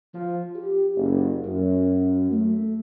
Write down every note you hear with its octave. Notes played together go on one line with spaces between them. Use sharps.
F3
G4
F#1
F#2
A3